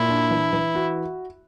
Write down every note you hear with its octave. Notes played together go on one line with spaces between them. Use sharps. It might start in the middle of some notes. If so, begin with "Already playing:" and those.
Already playing: A#2 E4
D4
E3
E3
F#4